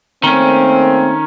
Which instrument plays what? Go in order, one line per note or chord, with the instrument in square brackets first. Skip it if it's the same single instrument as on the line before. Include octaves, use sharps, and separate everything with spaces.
[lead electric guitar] D#3 C#4 [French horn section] A3 A#3 C4